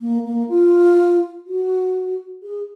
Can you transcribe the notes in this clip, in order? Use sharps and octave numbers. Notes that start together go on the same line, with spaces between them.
A#3
A#3
F4
F#4
G#4